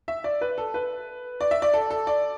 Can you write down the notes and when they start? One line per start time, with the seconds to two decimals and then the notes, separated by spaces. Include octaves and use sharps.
0.08 E5
0.24 D5
0.41 B4
0.58 A4
0.74 B4
1.41 D5
1.51 E5
1.62 D5
1.74 A4
1.90 A4
2.07 D5